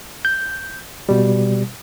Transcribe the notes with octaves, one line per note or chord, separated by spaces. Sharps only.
G6
B2 G3